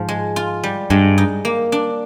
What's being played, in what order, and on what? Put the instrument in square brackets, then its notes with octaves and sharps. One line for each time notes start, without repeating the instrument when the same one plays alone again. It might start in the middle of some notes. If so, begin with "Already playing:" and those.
Already playing: [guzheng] G#2 F3
G#3
F4
G3
[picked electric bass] G2 [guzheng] G#3
[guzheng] D#4
A#3
D4